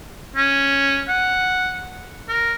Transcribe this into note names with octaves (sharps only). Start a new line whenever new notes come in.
C#4
F#5
A#4